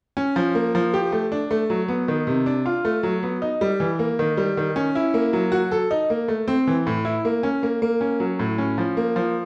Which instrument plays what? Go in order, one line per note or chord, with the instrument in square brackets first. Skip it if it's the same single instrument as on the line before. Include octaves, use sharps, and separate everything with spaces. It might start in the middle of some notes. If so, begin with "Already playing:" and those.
[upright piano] C#4
F3
A#3
F3
G4
A3
D4
A3
F#3
B3
D#3
C3
D4
F4
A3
F#3
B3
D#4
G3
E3
A#3
D#3
G3
D#3
C#4
E4
A#3
F#3
F#4
A4
D#4
A#3
A3
C4
E3
A2
E4
A#3
C#4
A#3
A#3
C#4
F#3
A2
C#4
F3
A#3
F3